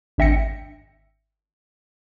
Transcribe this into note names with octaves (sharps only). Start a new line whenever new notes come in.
G#1 D4 E5 G5 A#6 C#7